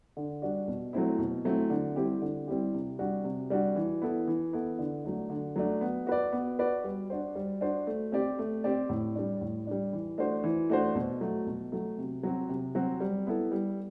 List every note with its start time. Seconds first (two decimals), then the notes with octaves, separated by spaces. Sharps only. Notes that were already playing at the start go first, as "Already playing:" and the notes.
0.17 D3
0.42 G3 D4 F#4
0.68 B2
0.93 F#3 A3 C4 E4
1.19 B2
1.45 F#3 A3 C4 E4
1.70 D3
1.96 G3 C4 E4 G4
2.22 D3
2.48 G3 C4 E4 G4
2.74 C3
2.99 G3 D4 F#4
3.24 C3
3.50 G3 D4 F#4
3.76 E3
4.02 B3 E4 A4
4.28 E3
4.53 B3 E4 A4
4.79 D3
5.04 F#3 A3 D4
5.30 D3
5.56 F#3 A3 D4
5.81 B3
6.07 F#4 B4 D5
6.32 B3
6.59 F#4 B4 D5
6.84 G3
7.10 D4 F#4 C5
7.35 G3
7.61 D4 F#4 C5
7.87 A3
8.12 C4 G4 D5
8.39 A3
8.64 C4 G4 D5
8.89 A2
9.15 G3 D4
9.41 A2
9.67 G3 D4
9.93 E3
10.18 A3 D4 F#4 C5
10.44 E3
10.70 A3 D4 F#4 C5
10.95 B2
11.21 F#3 A3
11.47 B2
11.72 F#3 A3
11.98 C3
12.23 F#3 C4 F#4
12.49 C3
12.75 F#3 C4 F#4
13.00 G3
13.27 B3 E4 A4
13.52 G3